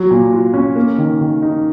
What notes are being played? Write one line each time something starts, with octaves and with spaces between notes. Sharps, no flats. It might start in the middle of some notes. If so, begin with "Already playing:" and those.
Already playing: F#3
A#2
F4
C#4
A#3
D#3
D#3
D#4